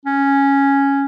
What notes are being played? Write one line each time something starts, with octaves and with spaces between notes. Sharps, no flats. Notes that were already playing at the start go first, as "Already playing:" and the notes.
C#4